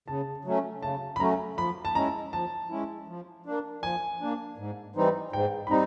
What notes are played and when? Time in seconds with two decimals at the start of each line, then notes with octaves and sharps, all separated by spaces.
0.08 C#3 A5
0.45 F#3 A3 C#4
0.82 C#3 A5
1.16 B5
1.20 F#3 A3 C#4 A#5
1.57 F3 B5
1.85 A5
1.95 G#3 C#4 E4 A#5
2.32 F3 A5
2.70 G#3 C#4 E4
3.08 F3
3.46 A#3 D4
3.82 F3 G#5
4.20 A#3 D4
4.58 G#2
4.96 E3 G3 C4 D#4
5.33 G#2 G5
5.67 B5
5.70 G3 C4 D#4 A#5